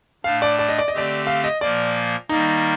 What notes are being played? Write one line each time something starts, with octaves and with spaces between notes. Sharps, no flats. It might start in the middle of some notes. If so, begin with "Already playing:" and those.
A2 A3 D4 F5
D5
D5
D#5
D5
D#5
D3 A3 C4 G4 D5
F5
D#5
A#2 F3 A#3 D5
D#3 G3 A#3 D#4